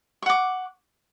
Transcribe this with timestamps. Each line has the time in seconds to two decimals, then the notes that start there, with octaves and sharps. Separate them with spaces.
0.22 C#6
0.26 F#5
0.29 D6